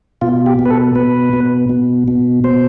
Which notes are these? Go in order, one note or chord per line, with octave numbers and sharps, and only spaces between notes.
B2 F4
G4
B2
B4
A4
B2 B4
B2
B2
B2
B2 C5